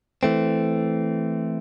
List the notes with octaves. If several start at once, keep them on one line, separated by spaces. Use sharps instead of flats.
E3 A3 C4